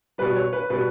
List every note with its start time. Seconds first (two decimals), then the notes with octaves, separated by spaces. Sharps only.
0.18 B2 G3 B4
0.36 C#5
0.53 B4
0.70 B2 G3 B4